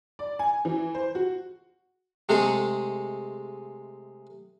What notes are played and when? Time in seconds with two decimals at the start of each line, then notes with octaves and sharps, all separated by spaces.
0.19 D5
0.39 G#5
0.65 E3
0.94 C5
1.15 F#4
2.29 C3 G#3 A3 G#4 A4